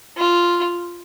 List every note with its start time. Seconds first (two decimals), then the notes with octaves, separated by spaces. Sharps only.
0.17 F4